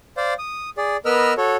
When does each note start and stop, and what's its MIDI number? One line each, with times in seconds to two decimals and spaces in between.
0.17 0.34 72
0.17 0.34 74
0.17 0.34 77
0.39 0.70 87
0.78 0.97 68
0.78 0.97 74
1.05 1.34 59
1.05 1.34 70
1.05 1.34 71
1.05 1.34 75
1.05 1.34 88
1.05 1.34 89
1.37 1.57 66
1.37 1.57 69
1.37 1.57 73